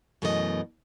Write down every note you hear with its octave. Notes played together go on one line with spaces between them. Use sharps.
F#2 B2 E3 A3 A#4 D#5